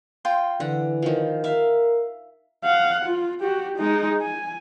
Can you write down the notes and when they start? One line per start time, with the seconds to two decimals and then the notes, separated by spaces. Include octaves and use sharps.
0.25 F4 G5 C6
0.60 D3 E3 F#5
1.02 D#3 F3
1.44 A#4 E5 F5
2.64 F5 F#5
3.05 F4
3.41 F#4 G4
3.77 G#3 D#4
4.21 G#5